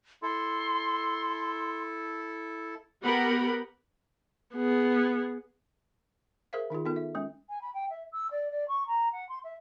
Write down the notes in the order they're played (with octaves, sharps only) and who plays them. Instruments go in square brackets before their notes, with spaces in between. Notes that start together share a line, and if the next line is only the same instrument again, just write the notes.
[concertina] E4 A4 [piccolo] C6
[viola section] B3 G4 A#4 F#5 B5
[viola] B3 G#4
[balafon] G#4 A#4 C5 E5 F5
D#3 D#4 F4 G#4
B3 D#4 F4 A4
E5
G#3 C#4
[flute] G#5
B5
G5
E5
E6
D5
D5
C#6
A#5
F#5
C6
E5